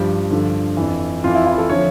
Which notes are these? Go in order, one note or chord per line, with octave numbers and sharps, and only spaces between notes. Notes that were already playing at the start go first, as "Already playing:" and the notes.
Already playing: G2 F3 G4
G2 D3 F3
F2 E3
F2 E3 F4
E4
E4
A4
D3 F3 C#5